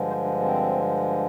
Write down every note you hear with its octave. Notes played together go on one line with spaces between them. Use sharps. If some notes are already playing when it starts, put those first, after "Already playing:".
Already playing: G2 D3 F3 G#3
C5
D4
C4